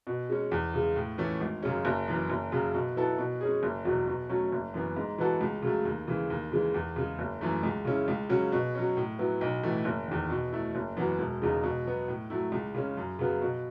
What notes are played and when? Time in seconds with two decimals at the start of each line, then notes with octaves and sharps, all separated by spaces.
0.07 B2
0.30 G#3 C#4
0.51 E2
0.74 C#3 G#3
0.96 A2
1.18 E3 A3 C#4
1.41 G#1
1.63 F#2 C#3 G#3 C#4
1.85 F#1
2.08 F#2 E3
2.30 F#1
2.52 F#2 C#3 F#3
2.74 B2
2.96 F#3 B3 E4 A4
3.18 B2
3.41 G#3 C#4 G#4
3.63 F#1
3.85 E2 B2 F#3
4.07 B2
4.30 F#3 A3 C#4
4.52 F#1
4.74 F#2 E3 B3
4.97 G#2
5.18 E3 B3 F#4 A4
5.41 C#2
5.62 C#3 F#3 A3
5.85 D#2
6.07 C#3 E3 G#3
6.30 D#2
6.52 C#3 E3 G#3
6.74 E2
6.96 C#3 G#3
7.19 F#1
7.41 F#2 E3 A3
7.63 C#2
7.85 C#3 G#3 C#4 E4
8.08 C#2
8.29 C#3 F#3 C#4 F#4
8.52 B2
8.75 F#3 C#4
8.97 A2
9.19 F#3 B3 E4
9.41 B1
9.63 A2 E3 A3
9.85 F#1
10.08 E2 D#3
10.30 B2
10.53 A3 E4
10.75 F#1
10.97 F#2 E3 B3 F#4
11.19 E1
11.42 E2 C#3 G#3 D#4
11.63 B2
11.86 F#3 B3
12.08 A2
12.30 F#3 A3 E4
12.52 C#2
12.75 C#3 G#3 C#4
12.97 F#2
13.19 C#3 F#3 B3
13.42 B2